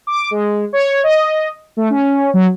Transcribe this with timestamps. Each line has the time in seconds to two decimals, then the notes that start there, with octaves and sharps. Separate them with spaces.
0.07 D6
0.31 G#3
0.73 C#5
1.03 D#5
1.77 A3
1.90 C#4
2.34 F#3